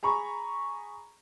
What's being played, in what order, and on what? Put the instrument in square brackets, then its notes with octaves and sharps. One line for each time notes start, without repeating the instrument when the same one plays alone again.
[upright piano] G#4 A#5 B5 C#6